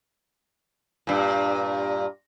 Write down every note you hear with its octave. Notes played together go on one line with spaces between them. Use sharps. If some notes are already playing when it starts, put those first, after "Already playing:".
G2 A#2